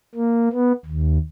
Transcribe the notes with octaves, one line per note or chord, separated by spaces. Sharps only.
A#3
B3
D#2